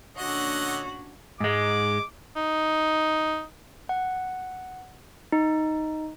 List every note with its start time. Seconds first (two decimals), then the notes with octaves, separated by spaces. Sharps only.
0.17 A#2 D3 C#4 D4 F#4 C#5 D#5 F#5
1.40 G#2 G#3 D6
2.36 D#4
3.89 F#5
5.32 D#4